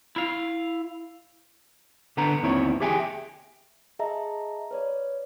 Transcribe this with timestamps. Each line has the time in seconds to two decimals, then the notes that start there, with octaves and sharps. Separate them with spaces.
0.16 E4 F5
2.17 D3 B3 D4 B4 A#5
2.43 D#2 D#3 B3 C4 E4 C#5
2.80 G4 G#4 E5 G5 G#5
3.99 G#4 D#5 E5 A5 A#5
4.71 B4 C#5 D5